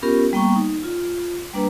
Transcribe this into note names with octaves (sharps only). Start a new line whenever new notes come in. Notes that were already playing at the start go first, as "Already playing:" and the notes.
B3 C#4 F4 G4 A#4
G3 A#3 B3 G5 A#5 C#6
D#4
F4
G3 A#3 D4 B4 A#5